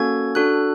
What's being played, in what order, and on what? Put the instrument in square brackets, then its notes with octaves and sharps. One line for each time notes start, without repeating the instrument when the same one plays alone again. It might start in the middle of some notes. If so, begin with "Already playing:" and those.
Already playing: [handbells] A#3 C#4 F#4 A4 G#6
D4 F#4 A4 F#6